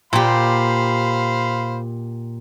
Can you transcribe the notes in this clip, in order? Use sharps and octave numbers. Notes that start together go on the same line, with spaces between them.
A#2 G4 C5 F5 B5